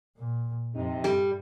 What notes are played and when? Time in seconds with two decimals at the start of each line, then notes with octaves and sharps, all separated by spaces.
0.17 A#2
0.74 F2 C3 D#4
1.04 G2 G3